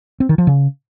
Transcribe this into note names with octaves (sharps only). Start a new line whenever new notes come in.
C4
D#3
F3
C#3